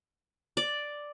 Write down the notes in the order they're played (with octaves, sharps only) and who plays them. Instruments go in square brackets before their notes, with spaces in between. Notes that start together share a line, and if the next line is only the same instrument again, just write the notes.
[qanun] D5